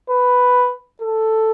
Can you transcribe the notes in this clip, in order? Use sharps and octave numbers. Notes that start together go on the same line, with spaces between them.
B4
A4